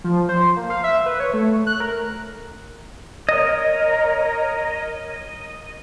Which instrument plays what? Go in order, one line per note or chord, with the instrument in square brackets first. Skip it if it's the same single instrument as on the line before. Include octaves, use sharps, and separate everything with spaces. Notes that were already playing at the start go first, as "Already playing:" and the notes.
[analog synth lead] F3
C5
A#3
F5
E5
B4
C#5
A3
F#6
A#4
[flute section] A#4 C#5 [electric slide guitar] D#5